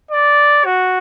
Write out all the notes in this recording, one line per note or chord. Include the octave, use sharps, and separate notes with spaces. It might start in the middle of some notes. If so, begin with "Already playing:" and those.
D5
F#4